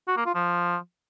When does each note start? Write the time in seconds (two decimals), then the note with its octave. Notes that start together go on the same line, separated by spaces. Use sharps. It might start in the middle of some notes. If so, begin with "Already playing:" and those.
0.08 F#4
0.17 A#3
0.26 F4
0.35 F3